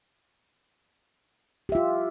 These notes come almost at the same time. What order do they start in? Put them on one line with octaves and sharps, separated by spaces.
G4 E5 F4